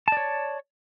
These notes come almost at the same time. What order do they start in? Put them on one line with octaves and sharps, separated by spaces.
A5 D5 C#5